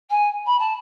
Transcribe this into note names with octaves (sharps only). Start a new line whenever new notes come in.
G#5
B5
A5